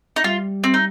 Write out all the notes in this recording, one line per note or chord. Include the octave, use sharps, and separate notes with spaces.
D#4
G3 F4
C4
D#4